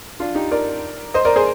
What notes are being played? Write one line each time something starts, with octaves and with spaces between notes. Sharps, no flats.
D4 F4
D#4 G4
A#4 D5
C5 D#5
A#4 D5
G#4 C5